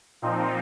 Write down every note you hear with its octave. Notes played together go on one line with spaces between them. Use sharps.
A#2 F3 C4 D#4